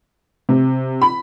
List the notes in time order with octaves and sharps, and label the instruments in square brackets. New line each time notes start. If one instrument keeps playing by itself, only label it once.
[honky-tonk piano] C3
B5